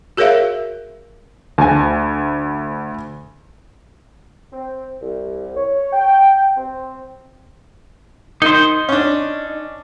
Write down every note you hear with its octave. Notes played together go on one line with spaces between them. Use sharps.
F#4 G#4 A#4 C#5 E5 F5
D2 G#5 A5
C4
C2
C#5
G5
C4
D#3 D#4 C5
C#4 D4